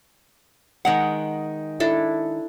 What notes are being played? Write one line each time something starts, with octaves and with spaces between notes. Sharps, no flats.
D#3 G#3 F#5
D4 E4 A4